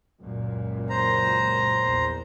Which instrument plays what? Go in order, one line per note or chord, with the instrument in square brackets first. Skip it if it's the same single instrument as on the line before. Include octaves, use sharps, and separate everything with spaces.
[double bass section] C#2 F#2 A#2
[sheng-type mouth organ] C5 A#5
[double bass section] A#1 E2